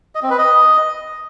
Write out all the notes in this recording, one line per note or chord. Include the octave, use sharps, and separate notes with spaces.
D#5
C4
B4
D#5